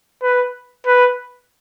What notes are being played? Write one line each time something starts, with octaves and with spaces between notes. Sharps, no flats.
B4
B4